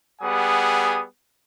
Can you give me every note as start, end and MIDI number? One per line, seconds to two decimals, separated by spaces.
0.22 1.04 55
0.22 1.04 59
0.22 1.04 68
0.22 1.04 78
0.22 1.04 80
0.22 1.04 87